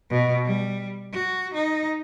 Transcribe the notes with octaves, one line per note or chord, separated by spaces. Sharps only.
B2
G3
F#4
D#4